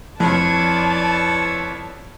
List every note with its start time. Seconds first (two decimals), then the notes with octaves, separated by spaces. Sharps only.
0.20 F2 E4 B4 C#5 D5 A5